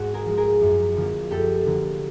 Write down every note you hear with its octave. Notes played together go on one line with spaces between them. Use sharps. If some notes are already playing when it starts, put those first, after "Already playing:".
Already playing: G#2 F#4
G#4 A#4
F3 G#3
G#4 A#4
F#2
D3 F3 A#3
F#2 G4 A4
D3 F3 A#3